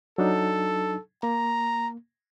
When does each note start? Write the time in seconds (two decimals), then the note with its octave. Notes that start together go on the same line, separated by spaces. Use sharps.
0.18 F#3 D4 D#4 A4
1.23 A#3 A#5